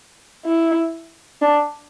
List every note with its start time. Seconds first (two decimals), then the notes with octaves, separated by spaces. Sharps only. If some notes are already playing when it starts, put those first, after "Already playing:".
0.45 E4
1.41 D4